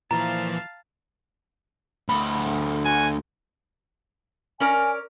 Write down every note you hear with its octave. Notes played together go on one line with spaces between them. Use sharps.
A#2 E3 F3 F5 A5 A#5
D2 B5
F#4 G#5
C#4 A#4 D5 G#5